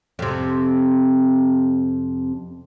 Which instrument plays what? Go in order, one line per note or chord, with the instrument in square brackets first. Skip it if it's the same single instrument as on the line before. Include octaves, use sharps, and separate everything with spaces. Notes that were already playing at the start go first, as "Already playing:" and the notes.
[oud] F2 C3